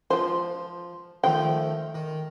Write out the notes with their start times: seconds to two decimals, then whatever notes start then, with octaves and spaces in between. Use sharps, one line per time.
0.10 F3 F4 C5
1.24 D#3 F3 A3 C5 G5
1.95 D#3